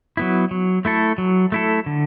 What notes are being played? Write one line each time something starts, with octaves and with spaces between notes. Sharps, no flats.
F#3 B3 E4
F#3
A3 E4 A4
F#3
A3 E4 A4
D3